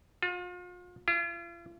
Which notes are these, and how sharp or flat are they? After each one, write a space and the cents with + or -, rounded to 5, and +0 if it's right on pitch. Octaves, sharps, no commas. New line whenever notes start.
F4 +40
F4 -40